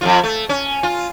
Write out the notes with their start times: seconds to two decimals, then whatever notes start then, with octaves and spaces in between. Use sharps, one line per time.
0.01 F2 G#2 F4
0.24 A3
0.49 C#4
0.83 F4